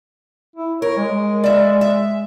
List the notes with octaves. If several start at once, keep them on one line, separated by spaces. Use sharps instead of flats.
E4
A#4 C#5
G#3
D5 E5
E5